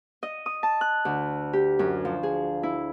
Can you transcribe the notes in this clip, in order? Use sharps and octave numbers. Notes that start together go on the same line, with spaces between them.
D#5
D#6
A5
F#6
D2
G4
F#2
F3
G#4
E4